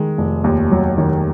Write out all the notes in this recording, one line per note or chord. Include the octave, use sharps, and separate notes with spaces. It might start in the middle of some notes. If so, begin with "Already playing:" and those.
Already playing: D#3 G#3
F1
D#2
F#3
D#3